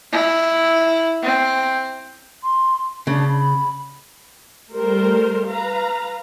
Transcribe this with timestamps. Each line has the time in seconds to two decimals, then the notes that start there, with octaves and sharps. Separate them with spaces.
0.12 E4
1.22 C4
2.43 C6
3.07 C#3 D4
3.27 B5
4.73 G3 A3 A#4 C5
5.48 B4 F5 A#5